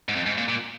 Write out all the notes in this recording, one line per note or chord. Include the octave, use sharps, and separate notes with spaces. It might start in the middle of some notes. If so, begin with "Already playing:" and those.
G#2
F2
G#2
A#2
A#2